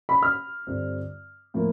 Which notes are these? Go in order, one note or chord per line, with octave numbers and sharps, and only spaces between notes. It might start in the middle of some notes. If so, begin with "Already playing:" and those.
B5
F6
G2 D3 G3 C4 F4
A2 F3 A#3